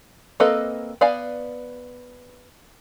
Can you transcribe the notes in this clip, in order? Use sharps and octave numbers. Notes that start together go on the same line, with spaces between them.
A#3 C4 A4 B4 D#5
B3 D5 F5 G#5